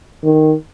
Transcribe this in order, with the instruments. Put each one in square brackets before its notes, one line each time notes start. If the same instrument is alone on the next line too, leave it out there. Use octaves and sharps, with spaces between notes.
[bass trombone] D#3